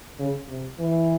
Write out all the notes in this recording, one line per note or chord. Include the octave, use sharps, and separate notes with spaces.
C#3
C3
E3